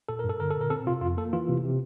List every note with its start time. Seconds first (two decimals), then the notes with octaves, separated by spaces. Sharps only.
0.09 A#2 A4
0.19 G2 A#4
0.29 A4
0.40 D3 A#4
0.51 A4
0.56 A#2
0.61 A#4
0.70 C4 A4
0.87 C3 F4
1.01 F2 F4
1.17 A#3 A4
1.33 E3 F4
1.49 C3
1.64 C3